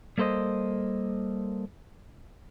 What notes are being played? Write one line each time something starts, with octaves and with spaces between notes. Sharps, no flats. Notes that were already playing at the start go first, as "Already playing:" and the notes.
G3 A#3 A4 C5 D#5